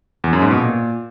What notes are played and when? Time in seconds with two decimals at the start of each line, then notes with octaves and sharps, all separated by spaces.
0.24 E2
0.33 F#2
0.42 G#2
0.51 B2
0.60 A#2